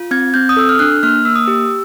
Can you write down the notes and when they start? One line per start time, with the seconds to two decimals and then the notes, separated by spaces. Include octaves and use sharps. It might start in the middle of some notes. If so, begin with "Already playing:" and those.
Already playing: F4
0.11 C4 G#6
0.34 C4 G6
0.49 D#6
0.57 A4 E6
0.69 F6
0.79 D4 F#6
1.03 A#3 F6
1.25 A#3 E6
1.35 D#6
1.46 G4 E6